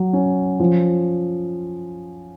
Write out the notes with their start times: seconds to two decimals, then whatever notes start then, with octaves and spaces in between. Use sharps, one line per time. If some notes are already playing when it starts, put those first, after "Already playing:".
Already playing: F#3
0.13 C#4
0.60 F3